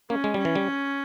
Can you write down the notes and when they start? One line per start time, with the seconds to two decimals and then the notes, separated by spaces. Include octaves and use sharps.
0.10 A#3 C#4
0.24 G#3
0.34 G3 C#4
0.45 E3
0.55 G3